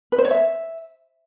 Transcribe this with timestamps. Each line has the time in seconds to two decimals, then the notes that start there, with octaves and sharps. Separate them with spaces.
0.12 B4
0.18 C5
0.25 C#5
0.31 E5